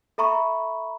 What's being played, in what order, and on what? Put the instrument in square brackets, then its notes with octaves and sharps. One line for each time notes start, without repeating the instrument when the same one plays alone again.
[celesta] A4 E5 A#5 B5 C#6